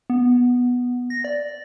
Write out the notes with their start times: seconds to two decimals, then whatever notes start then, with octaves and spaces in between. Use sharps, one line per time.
0.10 B3
1.10 A#6
1.24 D5